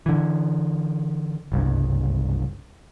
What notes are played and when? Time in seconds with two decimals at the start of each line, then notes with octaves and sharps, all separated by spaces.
0.06 D3 E3
1.52 F#1 C2 G2